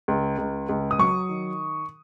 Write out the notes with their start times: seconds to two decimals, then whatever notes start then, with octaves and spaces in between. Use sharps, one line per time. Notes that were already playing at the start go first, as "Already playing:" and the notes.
0.08 C#2
0.38 C#2
0.69 C#2
0.91 D#6
0.99 F#3 C#6
1.29 D#3